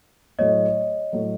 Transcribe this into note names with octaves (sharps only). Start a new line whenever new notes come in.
A2 F#3 A3 C#5 D#5
A2 F#3 A3